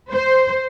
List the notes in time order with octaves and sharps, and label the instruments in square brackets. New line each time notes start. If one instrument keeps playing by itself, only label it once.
[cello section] C5